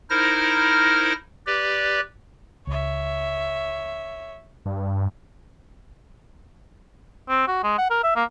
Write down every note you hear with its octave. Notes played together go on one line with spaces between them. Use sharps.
D#4 E4 A#4 C5 F6 A#6
G4 B4 D5
C#2 C#5 E5
G2
C4
F#4
G#3
F#5
A#4
E5
A#3